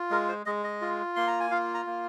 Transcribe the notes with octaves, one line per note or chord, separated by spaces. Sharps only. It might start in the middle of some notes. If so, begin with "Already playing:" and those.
Already playing: F4
G#3 A#4
C5
G#3 D#5
D#5
F4
A#3 C6
A#5
G#5
F4 F5
A#5
A#3